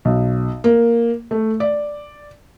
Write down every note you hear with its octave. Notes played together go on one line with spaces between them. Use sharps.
B1
A#3
A3
D5